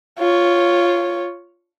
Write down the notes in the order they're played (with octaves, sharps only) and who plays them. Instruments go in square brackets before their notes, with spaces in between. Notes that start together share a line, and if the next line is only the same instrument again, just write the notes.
[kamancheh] F4 C#5